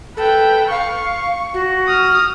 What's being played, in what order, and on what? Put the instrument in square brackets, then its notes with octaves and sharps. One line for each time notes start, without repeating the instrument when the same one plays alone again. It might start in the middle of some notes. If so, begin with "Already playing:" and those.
[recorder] A4 [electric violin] B4 G5
[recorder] F5 [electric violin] C#6
[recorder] F#4
[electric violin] D#6 F6